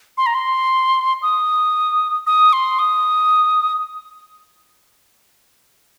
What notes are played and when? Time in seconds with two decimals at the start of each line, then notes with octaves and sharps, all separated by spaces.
0.18 C6
0.26 A#5
0.35 C6
1.22 D#6
2.27 D#6
2.53 C6
2.79 D#6